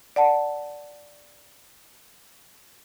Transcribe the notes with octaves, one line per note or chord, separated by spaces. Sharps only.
D5 F#5 A5